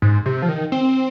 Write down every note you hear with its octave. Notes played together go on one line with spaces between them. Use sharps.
G#2
C3
F3
D#3
C4